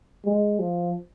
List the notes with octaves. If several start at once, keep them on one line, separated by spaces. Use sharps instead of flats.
G#3
F3